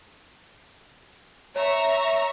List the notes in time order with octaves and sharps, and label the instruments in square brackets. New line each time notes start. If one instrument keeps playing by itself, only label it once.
[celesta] C#5 [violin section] E5 A#5 C#6